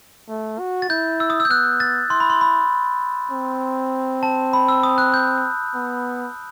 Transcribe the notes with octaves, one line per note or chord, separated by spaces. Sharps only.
A3
F#4
A6
E4 G6
E6
D#6
E6
G6
B3 F#6
A6
E4 C6
B5
C6
B5
C4
A5
B5
E6
D#6
F#6
G6
B3